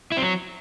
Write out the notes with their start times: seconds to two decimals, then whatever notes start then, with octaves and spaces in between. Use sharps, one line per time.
0.12 E4
0.17 C4
0.22 F#3